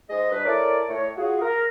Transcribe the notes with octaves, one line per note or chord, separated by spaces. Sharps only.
G#2 G#3 G#4 D#5
G2 B4
E4 A4 A#4 C#5 D5
A2 A3 C#5
F4 F#4 G#4
A#4